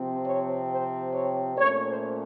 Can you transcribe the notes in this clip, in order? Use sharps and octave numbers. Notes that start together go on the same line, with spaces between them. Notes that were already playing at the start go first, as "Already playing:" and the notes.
Already playing: C3 F3 C4
C#5
C5
C#5
A#2 A3 C#4 C#5
C5